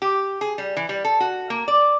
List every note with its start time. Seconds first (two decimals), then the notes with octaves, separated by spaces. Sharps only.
0.02 G4
0.41 G#4
0.58 G3
0.76 E3
0.89 G3
1.04 A4
1.20 F#4
1.50 A#3
1.68 D5